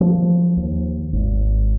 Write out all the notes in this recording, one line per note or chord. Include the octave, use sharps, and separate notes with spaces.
F3
D#2
G#1